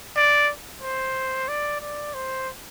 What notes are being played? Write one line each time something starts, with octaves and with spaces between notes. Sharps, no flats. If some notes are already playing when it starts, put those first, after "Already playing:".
D5
C5
D5
D5
C5